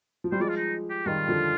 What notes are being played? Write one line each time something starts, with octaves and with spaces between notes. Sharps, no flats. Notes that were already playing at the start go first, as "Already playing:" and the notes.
F3
G3 C5
F3 G#3 D5
F4
D#4
G4
D#3 G3 F4
D3 F3